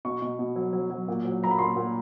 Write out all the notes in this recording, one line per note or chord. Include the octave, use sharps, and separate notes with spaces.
B2 C#6
B2
B2
F#3
F#3
F#3
A#2
F#3
F#3 A#5
B5
A#2 C6
A#2